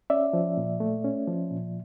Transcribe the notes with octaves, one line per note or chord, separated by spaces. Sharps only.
C#4 D5 E5
F3
A#2
A3
C#4
F3
A#2